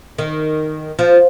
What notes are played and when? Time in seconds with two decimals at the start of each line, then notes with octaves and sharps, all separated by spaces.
0.18 D#3
0.99 F3